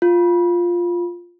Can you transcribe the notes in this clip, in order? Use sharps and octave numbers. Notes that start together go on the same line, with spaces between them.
F4